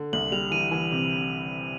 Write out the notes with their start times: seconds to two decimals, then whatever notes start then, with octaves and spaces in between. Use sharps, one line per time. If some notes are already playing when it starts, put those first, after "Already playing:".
Already playing: D3
0.13 C2 F#7
0.32 G3 F7
0.51 E3 D#7
0.71 E3
0.92 C3